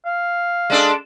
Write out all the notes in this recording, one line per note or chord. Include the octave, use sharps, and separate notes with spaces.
F5
G#3 D4 A4